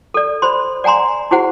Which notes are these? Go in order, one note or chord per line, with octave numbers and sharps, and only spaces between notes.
A4 D5
C5 B5 C6
D5 F#5 G#5 A#5 C6
E4 F#4 G#4 C5 F#5